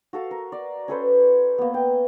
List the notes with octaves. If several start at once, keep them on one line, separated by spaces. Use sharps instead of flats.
F#4 A4 F5 A5
A#4
D5
C#4 A4 B4 C5
A#3 B3
G5